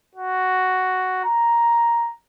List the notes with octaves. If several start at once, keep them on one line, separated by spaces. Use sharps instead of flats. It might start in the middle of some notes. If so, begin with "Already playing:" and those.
F#4
A#5